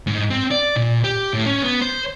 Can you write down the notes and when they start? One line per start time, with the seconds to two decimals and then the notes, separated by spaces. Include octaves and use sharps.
0.07 G#2
0.30 C4
0.51 D5
0.76 A#2
1.04 G4
1.34 A2
1.46 C#4
1.62 B3
1.81 C5